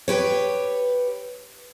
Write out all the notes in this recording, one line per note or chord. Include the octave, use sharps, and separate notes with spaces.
G4 B4 C#5